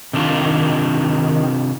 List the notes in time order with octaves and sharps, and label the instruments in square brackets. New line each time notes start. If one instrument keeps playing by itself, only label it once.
[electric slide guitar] C3 D4 F4 [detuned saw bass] D#3